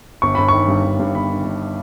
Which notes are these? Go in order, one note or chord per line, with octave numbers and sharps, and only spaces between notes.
G1 C#6
G1 B5
D#3 C#6
G2
G1
G2
G1 B5
D#3
G1